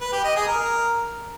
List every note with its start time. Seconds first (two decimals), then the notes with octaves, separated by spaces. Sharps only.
0.01 B4
0.12 G4
0.24 D#5
0.35 G#4
0.47 A#4